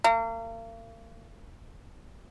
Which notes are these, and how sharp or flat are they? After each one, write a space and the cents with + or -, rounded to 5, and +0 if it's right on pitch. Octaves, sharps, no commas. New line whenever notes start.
A#3 -40